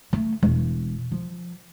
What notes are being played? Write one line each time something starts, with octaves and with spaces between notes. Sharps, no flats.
A3
E1
F3